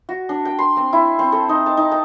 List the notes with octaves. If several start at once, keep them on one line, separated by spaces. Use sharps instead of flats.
F#4
D4
G5
C6
C4
E4
C4
A4
D#4
A5
D#4
A5